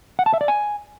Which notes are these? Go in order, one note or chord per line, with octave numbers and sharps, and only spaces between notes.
F#5
A5
E5
D5
G#5